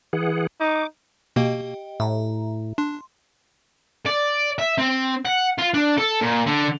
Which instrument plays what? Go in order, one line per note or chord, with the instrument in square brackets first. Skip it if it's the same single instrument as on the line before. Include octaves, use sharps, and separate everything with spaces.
[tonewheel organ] E3 G#4 F#5
[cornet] D#4 [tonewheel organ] D6
[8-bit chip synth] B2 A#3 [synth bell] G4 D#5 G5
[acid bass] A2 [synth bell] E5 A#5
[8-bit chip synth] D4 [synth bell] C6
[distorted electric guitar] D5
E5
C4
F#5
F4
D4
A4
A#2
D3